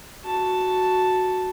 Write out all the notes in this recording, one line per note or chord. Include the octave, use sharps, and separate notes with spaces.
F#4 A5